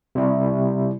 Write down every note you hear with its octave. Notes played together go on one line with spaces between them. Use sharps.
C3 G3 E4